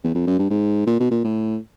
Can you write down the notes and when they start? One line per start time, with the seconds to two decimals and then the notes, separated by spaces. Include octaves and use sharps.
0.04 E2
0.14 F2
0.27 F#2
0.39 G2
0.50 G#2
0.86 A#2
1.00 B2
1.11 A#2
1.24 A2